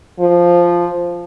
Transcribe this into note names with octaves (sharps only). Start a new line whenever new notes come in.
F3